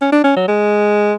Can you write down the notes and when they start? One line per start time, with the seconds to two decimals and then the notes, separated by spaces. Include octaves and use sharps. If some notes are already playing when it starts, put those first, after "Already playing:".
0.01 C#4
0.12 D4
0.24 C#4
0.36 F#3
0.48 G#3